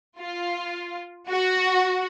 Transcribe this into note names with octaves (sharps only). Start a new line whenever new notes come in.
F4
F#4